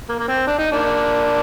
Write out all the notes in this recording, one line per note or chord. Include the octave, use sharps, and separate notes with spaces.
A#3
A#3
C4
D4
D#4
A#3 D4